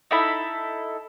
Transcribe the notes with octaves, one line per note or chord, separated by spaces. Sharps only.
D#4 E4 A4 B5